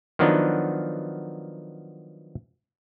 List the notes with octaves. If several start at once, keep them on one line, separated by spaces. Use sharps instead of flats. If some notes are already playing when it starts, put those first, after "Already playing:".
D#3 F3 F#3 B3 D4 D#4